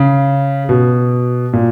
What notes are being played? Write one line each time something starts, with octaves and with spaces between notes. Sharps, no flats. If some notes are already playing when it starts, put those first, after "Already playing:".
Already playing: C#3
B2
A#2